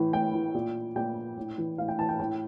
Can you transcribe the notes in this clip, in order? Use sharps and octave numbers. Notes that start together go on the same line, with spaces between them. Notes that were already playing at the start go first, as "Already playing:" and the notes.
Already playing: A2 E3
A2 G5
E3
A#2
A#2 G5
A2
E3
A2 F5
G5
E3 A5
G5
A2 G5